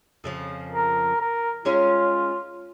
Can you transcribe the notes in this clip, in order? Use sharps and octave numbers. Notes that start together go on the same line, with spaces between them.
F2 C#3 F3
A#4
A#4
G#3 C#4 F4 C#5